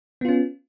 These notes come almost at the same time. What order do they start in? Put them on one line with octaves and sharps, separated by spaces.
B3 F4 C#4